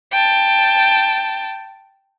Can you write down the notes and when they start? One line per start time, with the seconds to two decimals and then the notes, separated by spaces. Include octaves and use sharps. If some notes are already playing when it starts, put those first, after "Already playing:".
0.11 G5 A5